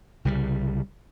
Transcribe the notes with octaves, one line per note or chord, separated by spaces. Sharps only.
C2 C#3 E3 G3